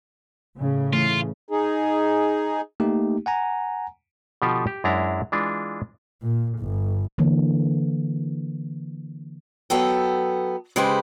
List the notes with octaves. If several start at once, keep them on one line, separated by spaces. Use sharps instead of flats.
A2 C#3
E3 A3 F4
D#4 G#4
A3 A#3 D#4 G4
F#5 G#5 A#5
B2 D3 F3 F4 G4 A4
G4
F#2 G#3 D4 E4 A#5
E3 G#3 D4 F4
A#2
G1
D3 E3 A#3
F#3 B3 A4 G5
C#3 G#3 G4 B4 C5